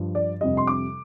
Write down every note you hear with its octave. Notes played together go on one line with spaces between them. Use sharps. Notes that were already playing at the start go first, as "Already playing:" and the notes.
Already playing: G2 F3
D5
F2 C3 G3 D#5
C6
D6